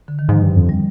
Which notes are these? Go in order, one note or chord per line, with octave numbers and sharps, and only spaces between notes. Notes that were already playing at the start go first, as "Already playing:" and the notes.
D3
D#3
G#2 F3
G2
F2
G3